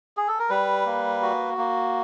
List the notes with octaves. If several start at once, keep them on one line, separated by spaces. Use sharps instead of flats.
G#4
A4
A#4
G3 B4
A#3
F#4
A#3